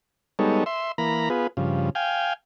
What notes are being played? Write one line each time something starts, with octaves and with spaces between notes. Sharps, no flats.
G3 G#3 B3 D#4 A4 C#5
E5 C6
E3 A#3 A#5 B5
B3 F4 G#4 B4
G2 C#3 F3
F5 G5 G#5